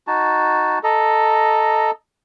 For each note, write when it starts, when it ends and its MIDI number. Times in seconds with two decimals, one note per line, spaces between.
0.07 0.79 63
0.07 0.79 66
0.07 0.79 81
0.84 1.91 69
0.84 1.91 75
0.84 1.91 82